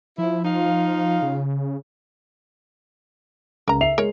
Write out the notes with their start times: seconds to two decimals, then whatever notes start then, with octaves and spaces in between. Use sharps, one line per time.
0.18 F3 E4
0.45 D#4 F4 F5
1.22 C#3
3.68 C#2 A#4 A#5
3.81 E5 C7 F7
3.98 G#3 A#4 C#5